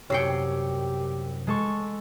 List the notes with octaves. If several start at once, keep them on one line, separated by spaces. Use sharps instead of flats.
C2 F#2 G4 C#5 G5 E6 C7 C#7
G#3 A4 C#6